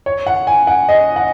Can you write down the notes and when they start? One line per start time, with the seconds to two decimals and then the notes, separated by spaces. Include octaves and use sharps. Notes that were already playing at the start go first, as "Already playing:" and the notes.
0.06 C#5
0.26 F#5
0.47 G#5
0.67 F#5
0.89 D#5
1.16 F#5